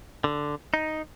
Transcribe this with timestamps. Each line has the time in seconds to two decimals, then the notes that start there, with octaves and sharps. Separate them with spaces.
0.24 D3
0.74 D#4